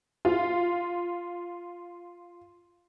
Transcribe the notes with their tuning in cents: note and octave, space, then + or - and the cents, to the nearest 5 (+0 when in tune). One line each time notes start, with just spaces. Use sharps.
F4 +0